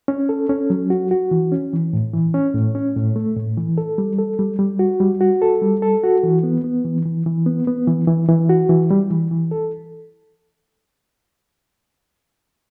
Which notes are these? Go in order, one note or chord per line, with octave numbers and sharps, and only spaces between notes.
C#4
A4
C#4
F#3
F#4
F#4
E3
C#4
E3
A2
E3
C#4
A2
C#4
A2
A3
A2
E3
A4
G3
A4
G3
G3
F#4
G3
F#4
A4
G3
A4
F#4
E3
B3
B3
E3
E3
E3
B3
B3
E3
E3
E3
F#4
E3
G3
E3
E3
A4